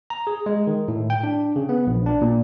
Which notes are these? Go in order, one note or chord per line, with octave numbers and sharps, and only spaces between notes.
A#5
G#4
G#3
D#3
A2
G5
D4
C#3
B3
A#1
D4
A#2